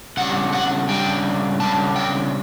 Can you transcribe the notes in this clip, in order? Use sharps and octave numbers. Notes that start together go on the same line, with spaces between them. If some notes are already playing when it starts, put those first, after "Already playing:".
C#3 G3 D4 F#5
F#5
C#3 G3 D4 G5
C#3 G3 D4 A5
G5